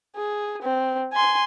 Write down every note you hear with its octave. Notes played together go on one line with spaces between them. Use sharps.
G#4
C4
G#5 C6